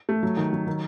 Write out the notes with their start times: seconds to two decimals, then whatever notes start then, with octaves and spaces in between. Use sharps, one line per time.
0.09 A3
0.23 F#3
0.37 D#3
0.53 F#3
0.67 D#3